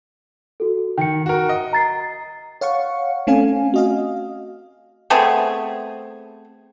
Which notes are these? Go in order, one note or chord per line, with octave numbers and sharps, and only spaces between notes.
F#4 A4
D#3 G5 C#7
F#4 A#4
D#5
A#5 A6 C7
C#5 F5 F#5 C#6
A3 C4 C#4 A4 F5 G#5
F#4 D#5 F5
A3 B3 C4 G#4